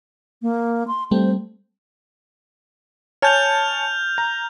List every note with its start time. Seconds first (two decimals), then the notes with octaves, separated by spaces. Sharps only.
0.42 A#3
0.88 C6
1.11 G3 A3 C4 C5
3.22 C#5 G#5 A5 F6 G6 F7
4.18 A#5